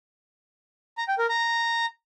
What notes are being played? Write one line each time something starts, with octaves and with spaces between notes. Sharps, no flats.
A#5
G5
A#4
A#5